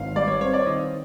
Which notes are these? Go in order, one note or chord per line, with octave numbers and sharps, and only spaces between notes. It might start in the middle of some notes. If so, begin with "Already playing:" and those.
Already playing: G#1 F5
G3 D5
C#5
C4 C#5
D5
D#3 D#5